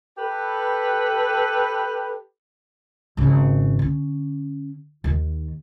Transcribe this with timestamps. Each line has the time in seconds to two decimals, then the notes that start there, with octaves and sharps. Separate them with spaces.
0.18 G4 A4 B4
3.17 G#1 C#3
3.79 D3 C#4
5.04 D#2 D#3